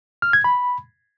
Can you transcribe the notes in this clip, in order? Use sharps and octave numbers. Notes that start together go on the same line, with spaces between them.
F6
G#6
B5